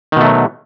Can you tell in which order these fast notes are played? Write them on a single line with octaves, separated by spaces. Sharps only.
D#3 B2 A3 F#3